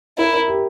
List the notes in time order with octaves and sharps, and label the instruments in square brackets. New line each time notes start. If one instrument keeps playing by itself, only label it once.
[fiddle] E4 [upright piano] A#4
[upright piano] A#4
G4